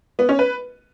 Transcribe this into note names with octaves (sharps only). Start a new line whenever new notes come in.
B3
C#4
B4